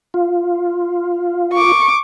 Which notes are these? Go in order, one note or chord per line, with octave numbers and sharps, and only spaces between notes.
F4
C#6 D6